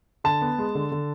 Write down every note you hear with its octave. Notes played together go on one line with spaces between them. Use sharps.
D3 A5
B3
G#3
D3
D3